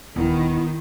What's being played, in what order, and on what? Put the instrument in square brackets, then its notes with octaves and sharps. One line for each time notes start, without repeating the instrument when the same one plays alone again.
[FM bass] D#1 [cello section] D#3 [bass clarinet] B3 [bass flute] E4